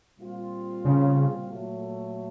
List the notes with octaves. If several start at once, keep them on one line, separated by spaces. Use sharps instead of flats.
A#2 G3 C4 F4
C#3
A#2 F#3 A3